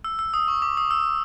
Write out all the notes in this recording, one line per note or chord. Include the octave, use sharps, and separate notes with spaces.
E6
E6
D#6
C#6
D6
D#6
E6